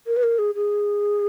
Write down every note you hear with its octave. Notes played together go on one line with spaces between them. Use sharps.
A#4
B4
A#4
G#4
G#4